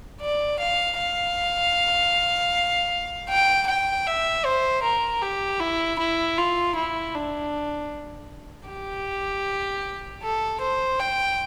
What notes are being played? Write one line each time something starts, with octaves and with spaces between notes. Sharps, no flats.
D5
F5
F5
G5
G5
E5
C5
A#4
G4
E4
E4
F4
E4
D4
G4
A4
C5
G5